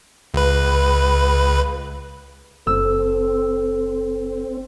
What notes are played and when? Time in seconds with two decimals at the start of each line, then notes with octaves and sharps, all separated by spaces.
0.34 C#2 B4
2.67 F#1 C4 A4 E6